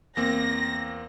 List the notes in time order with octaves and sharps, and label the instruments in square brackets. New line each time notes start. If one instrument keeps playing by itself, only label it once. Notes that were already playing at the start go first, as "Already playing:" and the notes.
[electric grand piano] E2 A#3 C4 [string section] A#6